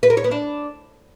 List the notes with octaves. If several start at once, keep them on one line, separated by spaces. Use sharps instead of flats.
B4
A#4
C#5
B3
D4